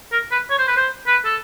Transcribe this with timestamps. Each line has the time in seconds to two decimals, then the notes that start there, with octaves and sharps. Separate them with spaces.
0.12 A#4
0.32 B4
0.50 C#5
0.59 C5
0.68 B4
0.77 C5
1.07 B4
1.25 A4